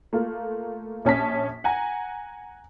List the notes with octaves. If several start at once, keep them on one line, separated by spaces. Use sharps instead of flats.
A3 A#3 F4
A#1 C#4 A5 B6
F#5 G#5 A#5